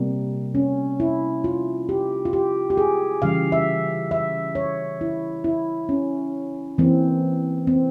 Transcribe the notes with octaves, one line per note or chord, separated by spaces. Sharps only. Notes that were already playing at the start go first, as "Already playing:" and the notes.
Already playing: C3 G3 A#3
C#4
E4
F4
G4
F4
G4
G4
G#4
C#3 E3 G3 F5
E5
E5
C#5
E4
E4
C#4
E3 A#3 C4
C4